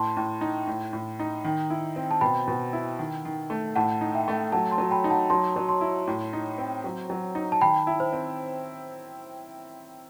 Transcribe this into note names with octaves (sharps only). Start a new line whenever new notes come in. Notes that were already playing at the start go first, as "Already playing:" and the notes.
Already playing: A2 A5 C6
A2
D#4
A2
A2
D#4
D#3
E4
C4
A5
B2 G5 B5
B2
E4
D#3
D#3
A3
A2 F#5 A5
D#4
E5 G5
A3
F#3 F#5 A5
A5 C6
F#3
G5 B5
D#4
F#5 A5
F#3 A5 C6
F#3
A5 C6
E4
A2
D#4
C4
F#3
F#3
D#4
A5
D#3 G5 B5
E4
C5
C4